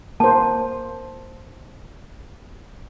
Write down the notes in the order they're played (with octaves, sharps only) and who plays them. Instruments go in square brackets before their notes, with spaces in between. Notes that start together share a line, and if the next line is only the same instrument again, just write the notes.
[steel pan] A#3 C5 [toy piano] A5